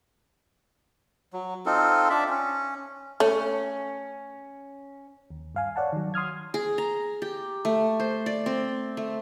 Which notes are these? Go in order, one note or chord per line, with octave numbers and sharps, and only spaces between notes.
F#3
C4 D#4 F4 A4
D4 D5 E5
C#4
A3 C#4
D#2
G2 F5 G#5
C#5 D5 F#5 A5
D#3 F#3
C6 D#6 F6 G#6
G#4
A#5
G4
A3
C5
D5
C4
A3